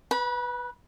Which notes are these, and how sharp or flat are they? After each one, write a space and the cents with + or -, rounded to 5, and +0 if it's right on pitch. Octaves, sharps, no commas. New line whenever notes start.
B4 +0 B5 -35